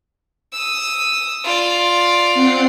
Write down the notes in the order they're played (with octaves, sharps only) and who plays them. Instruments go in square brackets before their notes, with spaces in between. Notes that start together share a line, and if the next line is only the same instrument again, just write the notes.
[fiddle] D#6 E6
F4 D5
[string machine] C4 F#5 C7